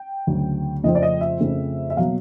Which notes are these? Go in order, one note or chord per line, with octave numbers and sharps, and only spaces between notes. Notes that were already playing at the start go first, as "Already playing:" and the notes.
Already playing: G5
D2 C#3 F#3
F2 C#3 F3 A3 C4 D#5
D5
D#5
E5
F2 C#3 F3 A3 C4
E5
B2 F#3 A#3 F5